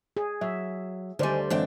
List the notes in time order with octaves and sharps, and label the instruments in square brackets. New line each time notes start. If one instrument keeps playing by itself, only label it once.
[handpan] G#4
[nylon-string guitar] F#3 [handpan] E5
[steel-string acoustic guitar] D2 G3 [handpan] D3 C5 D5 [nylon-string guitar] D#3 G#5
[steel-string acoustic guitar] F#2 F3 G5 [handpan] E3 [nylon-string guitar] G#3 C4 D4